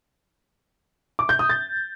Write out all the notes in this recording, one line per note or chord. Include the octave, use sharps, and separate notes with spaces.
D6
G6
D#6
A6